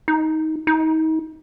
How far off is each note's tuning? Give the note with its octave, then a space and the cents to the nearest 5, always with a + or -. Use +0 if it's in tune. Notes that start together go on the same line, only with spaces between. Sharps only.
D#4 +20
D#4 +35